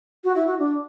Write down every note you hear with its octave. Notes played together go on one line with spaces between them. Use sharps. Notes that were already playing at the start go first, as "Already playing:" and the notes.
F#4
E4
F#4
D4